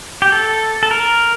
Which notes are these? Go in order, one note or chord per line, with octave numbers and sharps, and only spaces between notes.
G4
A4
A4
A#4